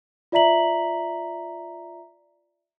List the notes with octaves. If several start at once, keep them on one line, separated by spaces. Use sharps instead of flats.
F4 D5 E5 A#5 B6 F#7